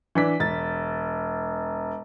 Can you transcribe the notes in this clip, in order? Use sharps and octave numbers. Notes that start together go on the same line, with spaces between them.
E3 D4 B6
E1 A6